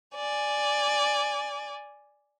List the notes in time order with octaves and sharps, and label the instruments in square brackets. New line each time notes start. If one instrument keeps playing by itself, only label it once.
[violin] D5 G#5